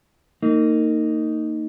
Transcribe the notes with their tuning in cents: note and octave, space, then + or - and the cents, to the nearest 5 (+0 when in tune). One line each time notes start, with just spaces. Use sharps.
A#3 -30 D#4 +0